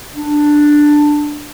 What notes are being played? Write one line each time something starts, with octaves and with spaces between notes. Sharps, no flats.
D4